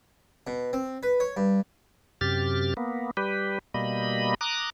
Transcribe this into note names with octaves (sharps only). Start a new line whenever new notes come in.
B2
C4
B4
C#5
G2
F#2 C3 G4 F6 A6
A#3 B3
G3 G4 B4
B2 G3 A#3 D#5 B5
A#5 D6 D#6 F#6